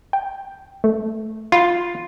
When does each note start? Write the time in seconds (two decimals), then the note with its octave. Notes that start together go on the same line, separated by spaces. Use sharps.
0.13 G5
0.84 A3
1.52 F4 B5